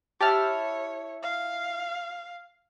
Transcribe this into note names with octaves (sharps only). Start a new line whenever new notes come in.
E4 G4 C#5 E5 A5 F6
F5